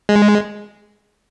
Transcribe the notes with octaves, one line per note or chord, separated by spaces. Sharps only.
G#3